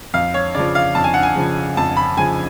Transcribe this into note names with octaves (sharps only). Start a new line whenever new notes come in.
F2 F5
C#5
C#3 F3 D5
F5
F2 A5
G#5
F#5
G#5
C#3 F3
F2 A5
B5
C#3 F3 G#5